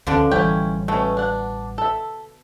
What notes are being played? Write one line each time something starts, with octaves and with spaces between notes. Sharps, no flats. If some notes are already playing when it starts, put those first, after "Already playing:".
D2 D3 F3 C#4 D4
A1 E3 G3 C#4 E4 G5
B2 A3 C#4
D4 F#5
A4 E5